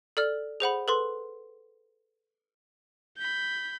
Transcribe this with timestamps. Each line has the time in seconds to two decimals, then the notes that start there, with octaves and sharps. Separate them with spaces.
0.17 A4 D5 F6
0.60 G#4 C5 F#5 B5
0.88 A4 B4 C6
3.18 B5 G6